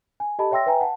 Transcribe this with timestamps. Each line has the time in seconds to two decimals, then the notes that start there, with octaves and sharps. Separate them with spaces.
0.20 G#5
0.39 G4 A4 D#5 A5 B5
0.51 C#5 E5 G5 C6 E6 A#6
0.66 B4 E5 G5 G#5 A#5
0.81 F#5 A5